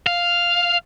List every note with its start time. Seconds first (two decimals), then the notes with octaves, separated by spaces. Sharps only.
0.06 F5